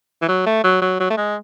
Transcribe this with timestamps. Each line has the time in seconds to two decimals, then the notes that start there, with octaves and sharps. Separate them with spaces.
0.22 E3
0.28 F#3
0.46 A3
0.64 F#3
0.82 F#3
1.00 F#3
1.10 A3
1.17 G#3